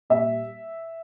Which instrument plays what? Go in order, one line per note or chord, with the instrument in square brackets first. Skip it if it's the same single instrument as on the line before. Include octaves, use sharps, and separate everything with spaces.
[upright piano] A#2 G3 E5